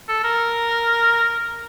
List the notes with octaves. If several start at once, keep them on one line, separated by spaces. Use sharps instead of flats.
A4
A#4